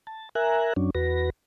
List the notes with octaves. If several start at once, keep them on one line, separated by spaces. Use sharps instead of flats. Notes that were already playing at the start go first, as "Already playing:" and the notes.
A5
A#4 E5 G#5 A#5 F#6
F#2 F#3 C#4 D4
E2 F#4 B4 A#6